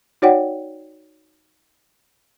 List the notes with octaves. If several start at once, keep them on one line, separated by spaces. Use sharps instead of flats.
D#4 F#4 C#5 D5 F#5 G5